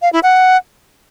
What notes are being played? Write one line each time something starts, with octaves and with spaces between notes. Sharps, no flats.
F5
E4
F#5